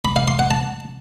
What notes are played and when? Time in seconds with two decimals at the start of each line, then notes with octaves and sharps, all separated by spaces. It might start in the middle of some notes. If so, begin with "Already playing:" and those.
0.05 B5
0.16 F5
0.28 C6
0.39 F#5
0.51 A5